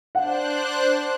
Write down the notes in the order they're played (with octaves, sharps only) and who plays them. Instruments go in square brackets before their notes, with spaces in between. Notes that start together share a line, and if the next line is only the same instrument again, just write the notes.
[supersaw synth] D4 C5 F#6 [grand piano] F#5